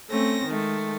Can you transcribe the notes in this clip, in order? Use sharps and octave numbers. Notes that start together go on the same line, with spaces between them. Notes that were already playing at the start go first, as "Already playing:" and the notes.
A3 C4 C#4 A#6
D#3 G#3 A3